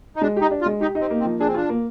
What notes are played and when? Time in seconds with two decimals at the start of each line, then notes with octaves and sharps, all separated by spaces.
0.16 D#4
0.21 G#3 D4
0.36 D#4 G4
0.51 D4
0.61 F4
0.66 G#3
0.81 D#4 G4
0.95 D#4
1.01 C4
1.10 A#3
1.20 C4
1.25 F3
1.40 D4 G#4
1.48 C4
1.54 D4 F4
1.69 A#3